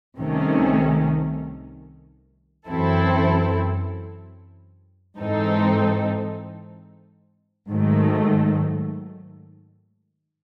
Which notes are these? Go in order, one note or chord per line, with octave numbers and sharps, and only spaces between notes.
C2 C3 D#3 A3 C#4
F#2 E3 C4 E4 A4
G#2 E3 C4 D#4 A4
G#2 D#3 F#3 A3